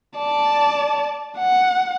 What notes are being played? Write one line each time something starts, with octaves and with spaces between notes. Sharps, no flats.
D5 A5
F#5